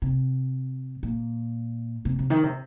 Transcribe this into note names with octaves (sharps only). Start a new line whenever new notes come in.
C3
A#2
C3
C3
D#3
C3